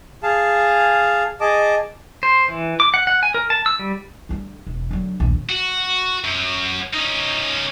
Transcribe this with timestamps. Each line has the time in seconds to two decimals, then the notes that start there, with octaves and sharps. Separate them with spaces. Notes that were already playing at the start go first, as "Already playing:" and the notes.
0.23 G#4 F5 A5
1.41 G#4 D#5 A5 D6
2.23 C5
2.48 E3
2.80 D6
2.94 F#5
3.07 F#5
3.23 G#5
3.34 A#4
3.50 A5
3.66 E6
3.79 G3
4.29 D3 G3
4.67 E1
4.91 D3 F#3
5.20 A#1 D#2
5.50 F#4
6.25 F#2
6.93 C#4 D#4